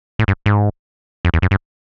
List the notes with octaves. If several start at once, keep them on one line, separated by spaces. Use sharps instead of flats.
A2
G2
G#2
F2
E2
F#2
G2